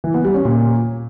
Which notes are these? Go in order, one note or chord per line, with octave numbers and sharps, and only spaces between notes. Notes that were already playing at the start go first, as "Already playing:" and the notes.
E3
B3
G3
C#4
A#2